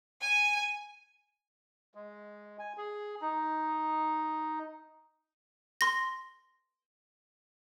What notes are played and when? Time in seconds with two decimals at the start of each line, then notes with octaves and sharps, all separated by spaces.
0.21 G#5
1.95 G#3
2.59 G#5
2.78 G#4
3.22 D#4
5.81 C6 A#6